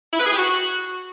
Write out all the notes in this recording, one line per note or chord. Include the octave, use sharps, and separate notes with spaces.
E4
B4
G#4
G4
F#4